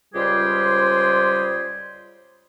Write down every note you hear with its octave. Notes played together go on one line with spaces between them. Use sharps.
C#2 G3 F4 G4 G#4 C5